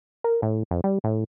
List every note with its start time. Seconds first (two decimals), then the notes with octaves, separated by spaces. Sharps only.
0.24 A#4
0.42 A2
0.71 F2
0.84 G3
1.04 A2